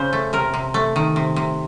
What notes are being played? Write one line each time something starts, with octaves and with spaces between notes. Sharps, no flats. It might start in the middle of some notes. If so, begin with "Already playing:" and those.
Already playing: C#3 C5
A3
C3 A#4
C3
A3
D#3
C3
C3